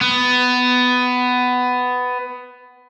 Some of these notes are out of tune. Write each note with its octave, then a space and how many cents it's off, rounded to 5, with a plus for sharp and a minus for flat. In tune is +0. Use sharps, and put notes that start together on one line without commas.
B3 +15